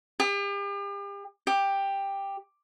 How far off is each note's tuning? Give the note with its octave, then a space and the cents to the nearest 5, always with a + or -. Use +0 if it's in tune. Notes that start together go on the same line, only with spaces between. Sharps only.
G4 +40
G4 +10